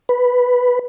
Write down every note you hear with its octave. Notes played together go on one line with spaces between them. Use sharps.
B4